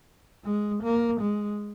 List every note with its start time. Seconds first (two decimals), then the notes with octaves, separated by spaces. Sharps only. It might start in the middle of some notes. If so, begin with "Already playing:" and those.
0.45 G#3
0.83 A#3
1.21 G#3